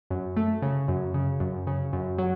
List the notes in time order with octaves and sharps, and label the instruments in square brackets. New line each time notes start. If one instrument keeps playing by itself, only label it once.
[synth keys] F#2
A3
C#3
F#2
C#3
F#2
C#3
F#2
F#3